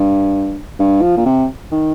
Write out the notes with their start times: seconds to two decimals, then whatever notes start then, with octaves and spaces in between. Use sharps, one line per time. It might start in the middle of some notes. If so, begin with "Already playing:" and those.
Already playing: G2
0.80 G2
1.02 F3
1.17 A#2
1.26 C3
1.72 D#3